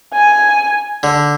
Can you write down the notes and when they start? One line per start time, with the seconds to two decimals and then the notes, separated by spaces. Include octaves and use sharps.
0.14 G#5
1.03 D3